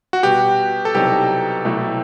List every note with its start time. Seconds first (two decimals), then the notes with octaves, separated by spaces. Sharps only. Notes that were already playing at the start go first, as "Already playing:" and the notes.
0.13 F#4
0.23 B2 G3 B3 G4
0.85 A4
0.94 C2 B2 F#3 C4 D#4 G4
1.65 C2 B2 F#3 A3 E4